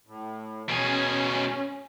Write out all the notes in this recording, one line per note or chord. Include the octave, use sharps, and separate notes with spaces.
A2
B2 C#4 G#4